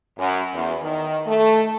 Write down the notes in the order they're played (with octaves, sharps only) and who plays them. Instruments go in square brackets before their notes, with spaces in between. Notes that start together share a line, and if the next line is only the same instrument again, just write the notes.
[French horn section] F#2
E2
D#3
A3